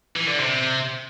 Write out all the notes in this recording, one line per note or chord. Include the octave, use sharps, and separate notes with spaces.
E3
D3
C3